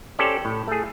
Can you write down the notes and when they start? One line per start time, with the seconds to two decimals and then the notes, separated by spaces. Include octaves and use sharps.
0.19 C#4 G4 A4 C5 D5
0.45 A2
0.68 A3 G#4